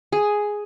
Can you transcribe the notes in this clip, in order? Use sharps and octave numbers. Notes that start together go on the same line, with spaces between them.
G#4